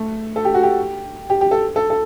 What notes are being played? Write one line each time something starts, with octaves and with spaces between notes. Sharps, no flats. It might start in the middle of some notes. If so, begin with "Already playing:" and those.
Already playing: A3
A4
G4
F#4
G4
G4
G4
A4
A4
A4